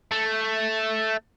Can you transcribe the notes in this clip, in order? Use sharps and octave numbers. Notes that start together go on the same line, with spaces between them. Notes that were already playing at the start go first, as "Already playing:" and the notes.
A3